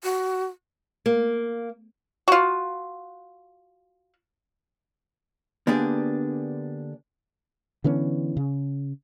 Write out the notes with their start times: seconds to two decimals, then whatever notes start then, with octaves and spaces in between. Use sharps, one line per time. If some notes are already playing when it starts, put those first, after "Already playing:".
0.03 F#4
1.06 A#3
2.28 F4 F#4
5.67 D3 A#3 B3 D4 G4 G#4
7.84 D3 E3 B3 C#4
8.37 C#3